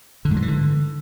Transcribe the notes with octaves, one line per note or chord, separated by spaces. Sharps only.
D3
G#2
F#3
E3
D3